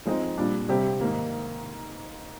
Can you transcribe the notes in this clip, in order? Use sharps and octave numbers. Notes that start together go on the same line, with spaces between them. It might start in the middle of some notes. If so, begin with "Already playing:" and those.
F3 G#3 C4 D#4
A#2 G3 D4
C3 G3 C4 G4
G#2 D#3 A#3